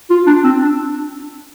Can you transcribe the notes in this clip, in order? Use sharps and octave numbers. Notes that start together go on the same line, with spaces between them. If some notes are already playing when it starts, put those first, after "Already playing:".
F4
D4
C4
D4